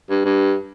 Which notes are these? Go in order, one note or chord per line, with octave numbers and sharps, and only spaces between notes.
G2
G2